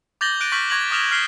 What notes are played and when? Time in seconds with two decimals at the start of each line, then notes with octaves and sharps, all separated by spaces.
0.21 D6 G6 A6 A#6 F#7 G7
0.40 F#6 D7 D#7
0.52 C#6 F6 G6 A#6 B6 F#7
0.70 C#6 G#6 A#6 F7 F#7
0.91 D6 D#6 F6 E7 F7 G7
1.11 F6 B6 C7 F7 G7